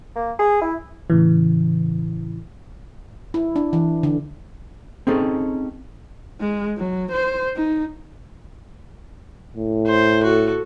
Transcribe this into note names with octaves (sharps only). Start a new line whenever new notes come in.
A#3
G#4
E4
A2 C#3 E3
E4
D4
E3
D3
C4 C#4 D#4 G#4 A4
G#3
F#3
C5
D#4
A2
C5
F#4 A4